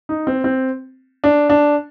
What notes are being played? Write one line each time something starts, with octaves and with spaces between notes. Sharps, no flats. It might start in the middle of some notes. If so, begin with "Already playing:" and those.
D#4
C4
C4
D4
D4